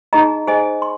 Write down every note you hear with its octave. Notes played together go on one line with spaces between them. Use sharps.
D#4 G#4 D#5 A#5
G#4 C5 D#5 G#5
C6